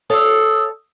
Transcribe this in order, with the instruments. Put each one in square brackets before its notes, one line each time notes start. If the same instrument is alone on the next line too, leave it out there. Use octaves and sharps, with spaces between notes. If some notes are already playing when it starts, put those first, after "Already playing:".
[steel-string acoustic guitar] A4 C#5 F5 [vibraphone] D#6 E6